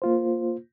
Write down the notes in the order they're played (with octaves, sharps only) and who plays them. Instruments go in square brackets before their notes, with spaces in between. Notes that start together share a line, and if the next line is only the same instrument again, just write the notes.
[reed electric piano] A#3 F4 C5